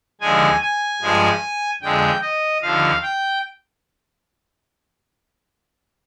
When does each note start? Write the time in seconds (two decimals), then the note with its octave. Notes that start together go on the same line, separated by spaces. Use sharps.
0.21 D#2 D3 F3 G#3 G#5
0.61 G#5
1.01 G2 F3 G#3
1.82 F2 D3 G#3 G5
2.22 D#5
2.62 D#2 D3 F3 F5
3.03 G5